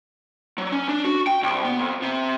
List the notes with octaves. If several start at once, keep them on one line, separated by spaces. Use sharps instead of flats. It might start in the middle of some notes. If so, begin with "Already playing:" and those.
F#3
C#4
D4
F#4
G5
C2
B3
F2
C3